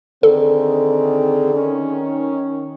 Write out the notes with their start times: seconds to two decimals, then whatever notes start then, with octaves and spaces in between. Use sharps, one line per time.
0.23 D3 D#3 C4 G#4 A4
1.53 D#3 C#4